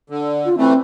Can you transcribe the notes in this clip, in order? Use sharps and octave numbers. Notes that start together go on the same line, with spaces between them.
D3
F4
E3 A3 C4